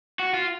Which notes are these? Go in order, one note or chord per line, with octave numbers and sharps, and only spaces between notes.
F#4
F4